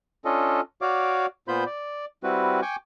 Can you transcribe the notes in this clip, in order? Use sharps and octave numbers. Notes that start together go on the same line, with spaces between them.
C#4 D4 F4 A4 D#5
F#4 C#5 D5 F5 D6
A#2 B3 F4 C5 B5 G6
D5
G3 C4 E4 F#4 B4
G5 G#5 C#6 D6